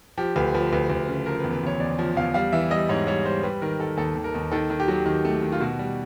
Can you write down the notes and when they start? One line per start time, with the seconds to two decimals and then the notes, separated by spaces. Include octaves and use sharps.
0.18 F3 G4
0.36 D2 B4
0.54 F3 B4
0.72 D2 B4
0.90 D2
1.09 C#3
1.26 F3 A#4
1.40 B4
1.44 E2
1.53 B4
1.63 E2 C#5
1.80 E2 D5
1.99 F3
2.17 E2 F5
2.34 G3 F5
2.52 E3 E5
2.71 G3 D#5
2.89 G#2 C#5
3.07 G3 C#5
3.25 G3 C5
3.43 G3 B4
3.62 D#3 A#4
3.79 D#3 A4
3.97 D#2 A4
4.15 D#2
4.24 A#4
4.35 D#2
4.52 D#3 A4
4.70 D#3
4.80 G4
4.88 F#3
5.06 D#3
5.25 A3
5.42 D#3
5.52 F4
5.60 B2 F#4
5.79 G3